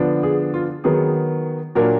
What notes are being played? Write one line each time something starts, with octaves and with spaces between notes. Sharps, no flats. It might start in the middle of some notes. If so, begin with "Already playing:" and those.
Already playing: D3 F3 B3 D4
G#4
F4
D#3 F#3 B3 G#4
A#2 F#3 A#3 D4 A#4